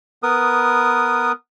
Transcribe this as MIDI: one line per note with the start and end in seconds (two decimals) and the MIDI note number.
0.23 1.32 59
0.23 1.32 70
0.23 1.32 71
0.23 1.32 87